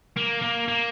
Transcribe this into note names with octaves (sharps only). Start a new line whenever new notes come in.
A#3
A#3
A#3